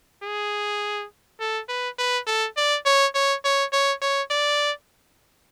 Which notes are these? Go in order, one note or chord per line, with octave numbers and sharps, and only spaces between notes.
G#4
A4
B4
B4
A4
D5
C#5
C#5
C#5
C#5
C#5
D5